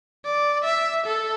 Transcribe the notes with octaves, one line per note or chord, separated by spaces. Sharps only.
D5
E5
A4